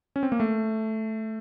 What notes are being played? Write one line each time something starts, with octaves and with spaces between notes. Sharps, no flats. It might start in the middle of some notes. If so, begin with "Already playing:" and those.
C#4
C4
A#3
A3